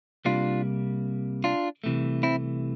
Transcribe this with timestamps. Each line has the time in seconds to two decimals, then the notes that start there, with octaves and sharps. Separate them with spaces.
0.25 C2 C3 G3 A#3 D4 F4
1.44 D4 F4
1.84 C2 C3 E3 A3
2.23 C4 E4